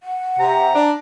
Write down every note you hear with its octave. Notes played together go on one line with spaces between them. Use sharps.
F#5
C3 A#5
D4